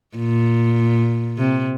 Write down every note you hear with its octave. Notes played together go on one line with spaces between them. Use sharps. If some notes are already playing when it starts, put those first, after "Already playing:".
A#2
C3